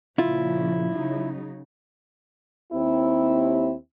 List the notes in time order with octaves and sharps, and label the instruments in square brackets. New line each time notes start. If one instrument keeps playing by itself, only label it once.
[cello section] A#2 C#3 F3 [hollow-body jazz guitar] E4 F4
[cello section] C#3 F#3 D#4
[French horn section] D#2 C4 E4